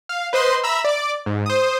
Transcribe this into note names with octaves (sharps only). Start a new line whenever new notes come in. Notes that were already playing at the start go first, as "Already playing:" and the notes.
F5
B4 C5 D#5 C6
E5 A#5 B5 E6
D5 D6
G#2
C5 D#6